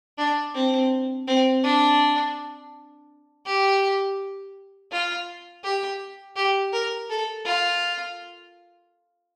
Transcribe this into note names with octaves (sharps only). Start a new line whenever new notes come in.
D4
C4
C4
D4
G4
F4
G4
G4
A#4
A4
F4